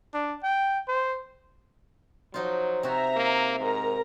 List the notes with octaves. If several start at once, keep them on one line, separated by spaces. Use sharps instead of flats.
D4
G5
C5
F3 F#3 D#4 F4
C3 F#4 E5 A#5
A#3
G#2 A#4 A#5